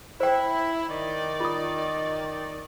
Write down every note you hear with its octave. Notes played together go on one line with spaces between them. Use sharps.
E4 C5 G5
D#3 D#4 D5
F4 D#6